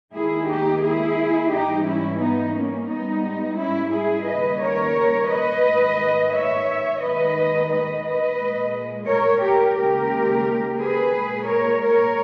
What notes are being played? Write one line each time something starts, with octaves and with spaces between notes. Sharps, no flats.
D#2 D#3 G#3 E4 G#4
D#4 G4
E4 G#4
G#2 E3 G3 D#4 G4
C#4 E4
B3 D#4
A#3 C#4
G#2 G3 B3 D#4
C#4 E4
E4 G#4
D#2 C#3 G3 B4 D#5
A#4 C#5
B4 D#5
G#2 D#3 G#3
C#5 E5
D#2 D#3 G#3 B4 D#5
B4 D#5
B4 D#5
A#2 G#3
A#4 C#5
G4 A#4
D#2 C#3 G#3 G4 A#4
G#4 B4
A#2 G#3
A#4 C#5
A#4 C#5